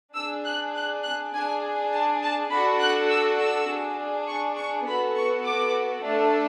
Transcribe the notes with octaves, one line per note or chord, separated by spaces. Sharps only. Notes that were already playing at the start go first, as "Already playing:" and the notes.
D4 G#4 E6
F#6
F#6
F#6
D4 G#4 G#5
A5
A5
D4 F#4 A4 B5
F#6
E6
E6
D4 G#4
C#6
C#6
B3 F#4 A4 B5
C#6
D6
A3 D4 A4